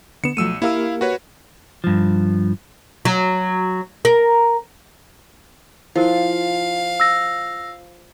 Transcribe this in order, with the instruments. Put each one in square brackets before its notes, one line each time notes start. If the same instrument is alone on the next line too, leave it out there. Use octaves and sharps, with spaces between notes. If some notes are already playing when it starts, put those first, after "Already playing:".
[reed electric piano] D3 B3 [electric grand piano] C#7 E7
[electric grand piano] B1 E6 D#7 [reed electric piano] F3 F#3 A3
[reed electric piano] A#3 G4 A#4 [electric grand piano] E4 F5 E6
[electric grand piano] F#4 B4 C#5
[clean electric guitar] G2 F3
[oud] F#3
A#4
[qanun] F3 [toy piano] E4 A#4 C5 [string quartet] F5
[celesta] E6 A#6